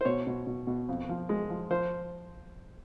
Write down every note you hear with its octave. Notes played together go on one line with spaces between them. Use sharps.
C5
B2 C#5
B2
B2
B2
F2
F3
G#3
F3
F3 C5